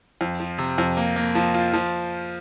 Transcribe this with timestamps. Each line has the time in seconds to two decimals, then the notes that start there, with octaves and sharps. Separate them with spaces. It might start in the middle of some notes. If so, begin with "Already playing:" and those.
0.21 F2
0.40 F3
0.58 C3
0.78 F2
0.97 A#3
1.16 A#3
1.35 F3
1.54 F4
1.73 F3